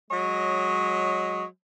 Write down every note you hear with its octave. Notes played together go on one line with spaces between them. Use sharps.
F#3 G#3 C#5 D#5